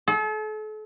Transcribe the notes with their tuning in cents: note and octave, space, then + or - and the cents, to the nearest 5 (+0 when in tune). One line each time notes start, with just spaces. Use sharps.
A4 -40